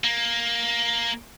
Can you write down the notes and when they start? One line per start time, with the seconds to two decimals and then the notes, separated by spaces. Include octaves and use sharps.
0.04 A#3